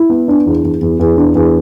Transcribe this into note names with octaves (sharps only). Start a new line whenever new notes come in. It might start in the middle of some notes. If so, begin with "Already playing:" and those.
Already playing: E4
B3
D4
E2
E2
E2
E2
D4
E2